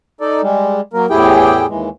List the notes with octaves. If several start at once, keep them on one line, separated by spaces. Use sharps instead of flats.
D#4 A4 D5
G3 G#3
F#3 A#3 A#4
E2 A2 E4 G4 G#4 G5
D#2 E3 G#3